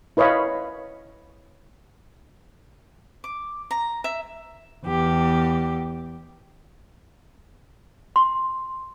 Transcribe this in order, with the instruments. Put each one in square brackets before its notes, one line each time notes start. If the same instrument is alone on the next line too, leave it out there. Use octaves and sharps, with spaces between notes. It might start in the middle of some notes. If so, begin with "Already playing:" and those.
[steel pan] E4 B4 C#5 D#5 F5 B5
[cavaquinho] D6
A#5
E5
[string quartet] E2 G4
[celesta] C6